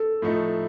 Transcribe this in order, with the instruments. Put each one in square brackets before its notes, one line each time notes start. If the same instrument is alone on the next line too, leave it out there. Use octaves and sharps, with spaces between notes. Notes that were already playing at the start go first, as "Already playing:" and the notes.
Already playing: [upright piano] A4
[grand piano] A2 F3 A3 D#4